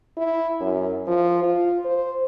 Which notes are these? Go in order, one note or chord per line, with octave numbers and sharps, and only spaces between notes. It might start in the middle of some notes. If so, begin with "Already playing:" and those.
E4
F#2
F3
F4
C5